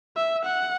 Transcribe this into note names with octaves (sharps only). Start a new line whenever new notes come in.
E5
F#5